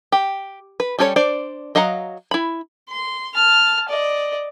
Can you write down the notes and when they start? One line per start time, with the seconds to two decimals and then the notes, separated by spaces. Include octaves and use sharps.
0.12 G4
0.80 B4
0.99 G3 C#4 A4 A#4 C#5
1.16 D4 C5 D5
1.75 F#3 D#5 F5 F#5 A#5
2.31 E4 B5
2.89 C6
3.35 A5 F6
3.89 D5 D#5